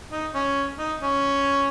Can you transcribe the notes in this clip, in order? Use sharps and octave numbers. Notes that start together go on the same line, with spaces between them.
D#4
C#4
D#4
C#4